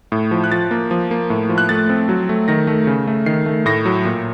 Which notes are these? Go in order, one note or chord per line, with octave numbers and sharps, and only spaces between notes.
A2
F3
F#6
F3 A6
A#3
F3
A#3
A2
F3
F#6
A3 A6
C4
F#3
A3
D#3 A#6
A3
C#3
A3
D#3 C7
A3
A2 A#6
F#3
A#2